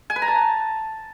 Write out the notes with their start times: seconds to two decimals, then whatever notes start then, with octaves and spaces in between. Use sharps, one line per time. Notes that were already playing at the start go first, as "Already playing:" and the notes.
0.10 G#5
0.16 B4
0.22 A#5
0.28 A5